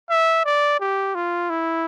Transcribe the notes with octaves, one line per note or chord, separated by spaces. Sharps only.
E5
D5
G4
F4
E4